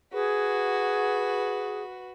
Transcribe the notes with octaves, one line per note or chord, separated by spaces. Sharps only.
F#4 G#4 B4